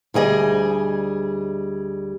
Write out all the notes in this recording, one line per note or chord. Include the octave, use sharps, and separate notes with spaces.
D2 G3 G#4 D#5